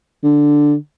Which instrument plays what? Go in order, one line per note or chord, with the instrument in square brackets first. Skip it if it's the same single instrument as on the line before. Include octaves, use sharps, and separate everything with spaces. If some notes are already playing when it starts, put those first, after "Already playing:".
[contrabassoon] D3